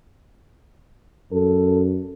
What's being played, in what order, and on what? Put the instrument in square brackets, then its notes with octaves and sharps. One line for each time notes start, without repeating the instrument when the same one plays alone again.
[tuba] F#2 [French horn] A4